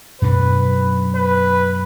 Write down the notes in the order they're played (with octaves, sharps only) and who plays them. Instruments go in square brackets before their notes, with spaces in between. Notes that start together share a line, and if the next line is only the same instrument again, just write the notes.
[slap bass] F#2 B2 D4 [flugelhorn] B4
[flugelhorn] B4